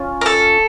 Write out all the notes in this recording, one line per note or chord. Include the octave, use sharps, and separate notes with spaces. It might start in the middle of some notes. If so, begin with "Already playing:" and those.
Already playing: C#4 F4
A#4
A4